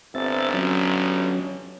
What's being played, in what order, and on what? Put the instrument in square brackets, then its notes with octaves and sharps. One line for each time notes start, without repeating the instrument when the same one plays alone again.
[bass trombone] G1 [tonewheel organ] C4 E5 A6
[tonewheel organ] F#3 C#4